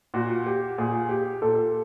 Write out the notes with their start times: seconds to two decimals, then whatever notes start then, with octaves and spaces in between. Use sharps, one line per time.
0.14 A#2 F#4
0.46 G4
0.78 A#2 G#4
1.09 G4
1.42 A#2 A4